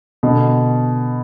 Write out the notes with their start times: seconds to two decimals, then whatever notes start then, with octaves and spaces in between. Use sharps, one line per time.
0.23 B2 D3